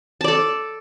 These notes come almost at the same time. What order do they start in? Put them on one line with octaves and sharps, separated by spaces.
A5 D5 A4